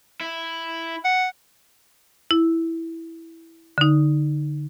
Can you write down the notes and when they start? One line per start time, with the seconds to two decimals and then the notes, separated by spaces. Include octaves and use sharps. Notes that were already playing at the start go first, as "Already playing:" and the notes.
0.21 E4
1.05 F#5
2.31 E4
3.78 D3 D#4